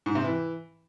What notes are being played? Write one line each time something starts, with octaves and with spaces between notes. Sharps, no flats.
G#2
C3
E3